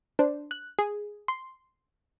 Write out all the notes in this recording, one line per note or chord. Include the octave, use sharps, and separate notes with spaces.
D4 C5
F#6
G#4
C6